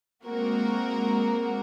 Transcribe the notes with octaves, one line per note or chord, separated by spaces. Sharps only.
G#3 A#3 C4 F#4 A#4